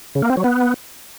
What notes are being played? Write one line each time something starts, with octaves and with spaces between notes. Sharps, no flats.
C#3
A#3
C4
F#3
B3